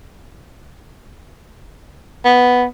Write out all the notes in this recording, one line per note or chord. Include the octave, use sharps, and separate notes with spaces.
B3